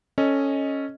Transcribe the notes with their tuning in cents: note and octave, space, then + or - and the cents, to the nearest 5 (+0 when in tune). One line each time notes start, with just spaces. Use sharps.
C#4 -5 A4 +0 D#5 +0